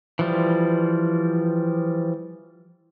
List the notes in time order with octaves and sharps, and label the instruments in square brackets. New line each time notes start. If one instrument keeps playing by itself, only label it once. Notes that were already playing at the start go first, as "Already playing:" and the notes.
[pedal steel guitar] E3 F3 G3